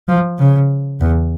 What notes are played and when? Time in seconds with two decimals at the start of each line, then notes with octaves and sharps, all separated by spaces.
0.09 F3
0.39 C#3
1.01 E2